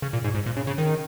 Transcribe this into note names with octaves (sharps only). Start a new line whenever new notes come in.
C#3
A#2
G#2
G#2
A#2
C#3
C#3
D#3